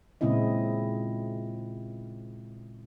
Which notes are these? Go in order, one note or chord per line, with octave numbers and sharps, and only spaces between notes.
A#2 C#3 G#3 C4 E4 D#5